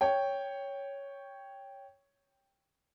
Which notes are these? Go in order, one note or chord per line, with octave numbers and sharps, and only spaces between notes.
C#5 G5